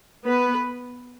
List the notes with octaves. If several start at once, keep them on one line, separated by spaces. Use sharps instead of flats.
B3 B4